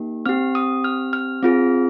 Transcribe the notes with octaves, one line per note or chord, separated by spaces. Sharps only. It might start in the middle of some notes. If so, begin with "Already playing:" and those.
Already playing: A#3 D#4 G4
C4 G4 F6
D#6
F6
F6
C4 F4 G#4